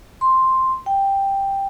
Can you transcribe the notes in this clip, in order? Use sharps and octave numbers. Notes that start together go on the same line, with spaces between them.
C6
G5